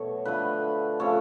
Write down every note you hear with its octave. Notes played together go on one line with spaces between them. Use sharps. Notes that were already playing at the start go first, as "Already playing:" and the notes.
Already playing: B2 F#3 A3 C#5
D3 F3 A3 B4
C#3 F3 A3 C#5